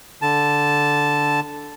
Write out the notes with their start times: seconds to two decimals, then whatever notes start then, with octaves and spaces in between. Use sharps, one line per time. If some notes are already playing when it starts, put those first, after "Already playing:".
0.22 D3 A5